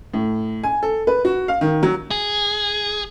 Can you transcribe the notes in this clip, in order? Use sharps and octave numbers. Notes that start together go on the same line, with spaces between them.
A2
G#5
A4
B4
F#4
F5
D#3
F#3
G#4